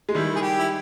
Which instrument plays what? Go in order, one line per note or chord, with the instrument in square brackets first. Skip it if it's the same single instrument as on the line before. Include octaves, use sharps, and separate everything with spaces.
[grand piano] G#3
[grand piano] D#3 G3 [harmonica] E4
[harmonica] G#4
G4
E4